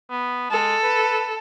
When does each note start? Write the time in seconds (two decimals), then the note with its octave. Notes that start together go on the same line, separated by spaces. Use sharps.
0.10 B3
0.51 G#3 A4
0.83 B4